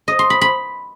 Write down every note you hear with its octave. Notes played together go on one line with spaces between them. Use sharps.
D#5
C6
B5
B5